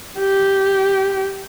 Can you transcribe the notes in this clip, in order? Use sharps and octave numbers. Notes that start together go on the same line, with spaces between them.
G4